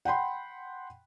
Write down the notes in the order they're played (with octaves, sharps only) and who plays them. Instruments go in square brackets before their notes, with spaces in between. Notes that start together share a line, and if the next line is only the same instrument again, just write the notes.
[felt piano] F#5 G5 B5 C6